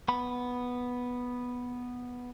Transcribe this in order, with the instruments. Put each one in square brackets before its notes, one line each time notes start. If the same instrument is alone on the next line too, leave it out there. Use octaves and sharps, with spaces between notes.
[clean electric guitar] B3 B5